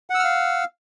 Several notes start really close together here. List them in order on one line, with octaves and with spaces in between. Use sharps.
F#5 E6 F6 F5